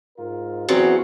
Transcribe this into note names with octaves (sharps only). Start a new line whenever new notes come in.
G#2 F4 A#4
E2 C#3 F#3 C4